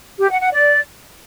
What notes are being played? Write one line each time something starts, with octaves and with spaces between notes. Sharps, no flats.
G4
F#5
F#5
D5